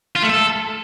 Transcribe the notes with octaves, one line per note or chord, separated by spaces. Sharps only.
F4
A3
A4